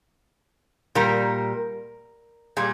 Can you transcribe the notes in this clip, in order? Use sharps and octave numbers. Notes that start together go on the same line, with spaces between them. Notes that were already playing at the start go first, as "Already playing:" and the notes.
A#2 G3 A#4
A#2 G3 G#4